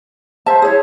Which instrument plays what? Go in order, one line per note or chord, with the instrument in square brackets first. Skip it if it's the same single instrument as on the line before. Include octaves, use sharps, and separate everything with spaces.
[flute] C5 [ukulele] E5 A5
[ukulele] E4 G#4 [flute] C#5